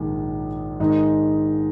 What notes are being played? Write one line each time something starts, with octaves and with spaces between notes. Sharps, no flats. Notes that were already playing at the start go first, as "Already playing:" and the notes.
Already playing: A#1 G#2 D#3 G#3
G#2 D#3 G#3 D#4